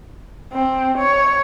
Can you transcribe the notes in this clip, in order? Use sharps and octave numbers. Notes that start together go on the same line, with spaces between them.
C4
C#5